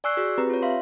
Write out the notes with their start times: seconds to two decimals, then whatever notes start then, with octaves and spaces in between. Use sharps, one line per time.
0.04 D5 G#5 C#6 E6 F#6 C7
0.17 F#4 G#4
0.38 C4 G4 B4 A#5
0.50 F4 C#5
0.62 E5 F5 C6